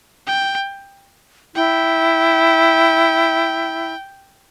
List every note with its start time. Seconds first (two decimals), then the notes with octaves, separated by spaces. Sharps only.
0.27 G5
1.55 E4 G5